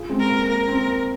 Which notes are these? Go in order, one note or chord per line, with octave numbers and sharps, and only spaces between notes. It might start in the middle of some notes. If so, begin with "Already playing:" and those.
Already playing: F4 G#4
G#3 C4
A#4
A#3
A#3 A#4
C4
A#3